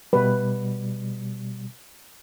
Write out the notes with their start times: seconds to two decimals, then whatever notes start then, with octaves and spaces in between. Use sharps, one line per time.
0.13 B2 G3 B4